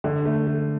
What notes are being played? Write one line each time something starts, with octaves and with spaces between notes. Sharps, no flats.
D3
A3
A3